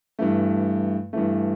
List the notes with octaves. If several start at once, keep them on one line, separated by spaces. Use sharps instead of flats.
G2 E3 A3
G2 E3 A3